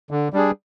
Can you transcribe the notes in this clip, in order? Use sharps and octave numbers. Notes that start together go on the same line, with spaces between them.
D3
G3 D4 G#4